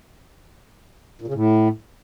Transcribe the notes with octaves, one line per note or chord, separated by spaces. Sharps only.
A#2
C#3
A2